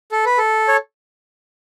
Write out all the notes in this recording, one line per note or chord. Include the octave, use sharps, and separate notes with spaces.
A4
B4
A4
C#5